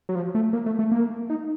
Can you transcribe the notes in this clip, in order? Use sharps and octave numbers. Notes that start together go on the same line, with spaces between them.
F#3
F3
A3
A#3
A3
A3
A#3
D#4